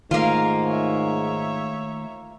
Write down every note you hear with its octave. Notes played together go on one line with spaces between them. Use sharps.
G#2 D#3 A3 A#3 F4 F5
C#5 E5